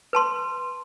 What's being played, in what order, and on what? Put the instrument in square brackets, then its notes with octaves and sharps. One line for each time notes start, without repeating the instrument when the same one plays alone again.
[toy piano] B4 A5 C6